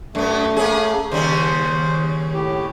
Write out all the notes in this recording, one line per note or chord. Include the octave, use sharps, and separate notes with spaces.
F#2 A3 B3
A#3 C#4 G#4
D#2 C#3 G3 C5
A2 G4